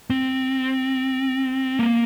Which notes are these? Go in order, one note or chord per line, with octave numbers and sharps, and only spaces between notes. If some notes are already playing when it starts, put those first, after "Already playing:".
C4
A#3